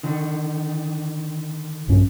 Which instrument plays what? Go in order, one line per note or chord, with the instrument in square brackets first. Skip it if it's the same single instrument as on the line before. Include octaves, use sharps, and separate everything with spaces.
[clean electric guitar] D3 D#3
[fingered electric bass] A#1 G2 C#4